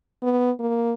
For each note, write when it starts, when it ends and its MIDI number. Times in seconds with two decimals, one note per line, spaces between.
0.22 0.51 59
0.59 0.94 58